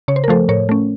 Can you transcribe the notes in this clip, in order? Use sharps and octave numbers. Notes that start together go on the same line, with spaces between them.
C#3 C#5
C5
A#4
F3 A3 A4 C5
A2 A#4 C#5
A3 C#4